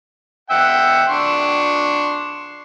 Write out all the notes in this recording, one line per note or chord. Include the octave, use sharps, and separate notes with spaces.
E5 F#5 G5
D4 C6 C#6